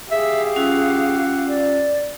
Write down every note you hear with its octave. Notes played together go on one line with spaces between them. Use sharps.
G4 G#4 E5 F5
C#4 F4 F#5 E6
D5